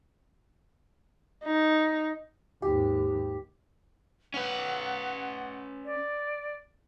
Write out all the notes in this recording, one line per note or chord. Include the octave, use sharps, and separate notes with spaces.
D#4
D#2 G#2 G4
C#4 B4 F#5
D5